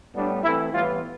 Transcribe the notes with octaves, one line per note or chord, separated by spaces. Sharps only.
A2 G3 B3 D4
E3 A3 C4 E4
A2 E3 G3 B3 F4